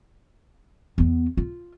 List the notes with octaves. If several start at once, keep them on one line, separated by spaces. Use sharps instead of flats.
E2 B3
F4